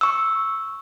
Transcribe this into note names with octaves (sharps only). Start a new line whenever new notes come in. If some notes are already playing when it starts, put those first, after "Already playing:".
C#6 E6